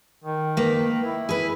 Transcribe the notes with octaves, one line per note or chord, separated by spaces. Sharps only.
D#3
A#3 B4
E4
G#4 B4